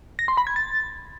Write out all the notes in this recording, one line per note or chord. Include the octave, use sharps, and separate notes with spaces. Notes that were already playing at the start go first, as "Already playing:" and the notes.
A#6
C6
B5
G#6
A6